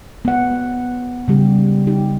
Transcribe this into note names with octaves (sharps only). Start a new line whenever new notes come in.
B3 F#5
C#3 G3 G4
D#4 G4